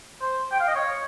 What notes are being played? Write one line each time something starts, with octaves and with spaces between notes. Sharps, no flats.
C5
G5
F5
D#5
C#5